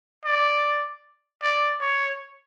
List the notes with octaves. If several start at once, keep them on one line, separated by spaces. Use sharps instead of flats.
D5
D5
C#5